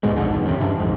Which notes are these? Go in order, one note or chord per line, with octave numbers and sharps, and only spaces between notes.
D2 G#2 B2 G#3
B1 F2 G#2 D3
G#1 E2
F#2 C3
G2 C3 E3 D4
A#1 F2 G#2